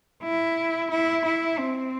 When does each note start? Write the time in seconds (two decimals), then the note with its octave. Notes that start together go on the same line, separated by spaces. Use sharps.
0.23 E4
0.91 E4
1.25 E4
1.59 C4